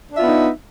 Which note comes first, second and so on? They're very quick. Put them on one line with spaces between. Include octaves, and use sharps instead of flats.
D4 E5 F4 B3 D#4